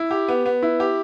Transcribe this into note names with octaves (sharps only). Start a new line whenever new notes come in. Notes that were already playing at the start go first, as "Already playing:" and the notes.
Already playing: E4
G4
B3
B3
E4
G4